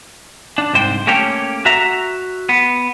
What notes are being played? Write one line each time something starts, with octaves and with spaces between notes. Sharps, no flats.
D4
C2 G#2 C5 G5
A3 A#3 C#4 G4 C#5 G5
F#4 E5 A#5
B3